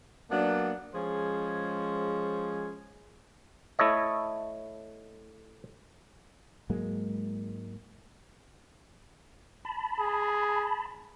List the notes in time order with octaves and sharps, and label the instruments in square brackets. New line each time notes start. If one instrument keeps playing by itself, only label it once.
[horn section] F#3 A#3 B3 D4
F3 G#3 C#4 G#4 C5
[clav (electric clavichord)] A3 E4 A4 C#5 D#5
[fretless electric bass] G#2 F#3 G#3 A#3
[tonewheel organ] A5 B5
[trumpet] G#4